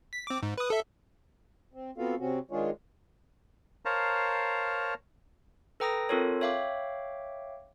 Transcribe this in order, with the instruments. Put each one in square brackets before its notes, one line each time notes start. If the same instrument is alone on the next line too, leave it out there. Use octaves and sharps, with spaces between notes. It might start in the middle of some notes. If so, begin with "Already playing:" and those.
[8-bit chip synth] B6
C4 D6
G#2
B4 D#6
A4 E5
[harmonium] C4
B3 C4 F4 F#4 A4 F5
C3 C4 C#4 F#4
D#3 G#3 D4 F4 G#4 C#5
[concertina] A#4 C5 C#5 F5 A5 A#5
[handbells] A4 B4 G5 A#5 D#6 A#6
C4 F4 A4 A#4 C#5
C#5 E5 F5 G5 D6